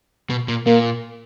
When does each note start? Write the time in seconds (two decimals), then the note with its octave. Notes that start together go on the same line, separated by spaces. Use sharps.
0.30 B2
0.48 A#2
0.66 A#2 A#3